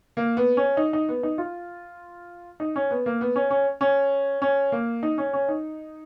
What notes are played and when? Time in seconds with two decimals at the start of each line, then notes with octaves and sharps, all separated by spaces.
0.17 A#3
0.37 B3
0.57 C#4
0.77 D#4
0.93 D#4
1.09 B3
1.23 D#4
1.38 F4
2.60 D#4
2.76 C#4
2.91 B3
3.06 A#3
3.21 B3
3.36 C#4
3.50 C#4
3.81 C#4
4.42 C#4
4.72 A#3
5.03 D#4
5.18 C#4
5.33 C#4
5.48 D#4